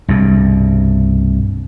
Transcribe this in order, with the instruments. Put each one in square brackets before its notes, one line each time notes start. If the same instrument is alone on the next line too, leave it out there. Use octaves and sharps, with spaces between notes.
[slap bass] C2 G2 B2